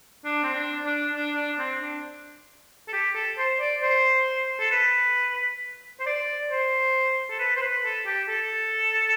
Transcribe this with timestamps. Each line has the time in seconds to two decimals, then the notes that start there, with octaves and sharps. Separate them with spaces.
0.25 D4
0.43 C4
0.55 D4
0.85 D4
1.15 D4
1.37 D4
1.59 C4
1.82 D4
2.88 A4
2.93 G4
3.15 A4
3.38 C5
3.60 D5
3.82 C5
4.60 A4
4.72 B4
6.00 C5
6.06 D5
6.50 C5
7.30 A4
7.39 B4
7.56 C5
7.62 B4
7.84 A4
8.06 G4
8.29 A4